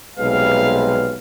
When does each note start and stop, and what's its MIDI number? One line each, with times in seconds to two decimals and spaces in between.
0.18 1.16 35
0.18 1.16 48
0.18 1.16 55
0.18 1.16 56
0.18 1.16 71
0.18 1.16 77